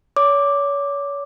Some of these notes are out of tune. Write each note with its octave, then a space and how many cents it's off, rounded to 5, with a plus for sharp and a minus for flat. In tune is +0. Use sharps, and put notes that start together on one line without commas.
C#5 +35 D6 +0